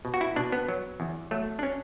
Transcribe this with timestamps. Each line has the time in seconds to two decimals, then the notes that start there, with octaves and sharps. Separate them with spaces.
0.05 B2
0.14 F#4
0.21 E4
0.36 B2 D4
0.52 B3
0.68 F#3
1.00 E2
1.31 F#3 A3
1.59 D4
1.63 C#4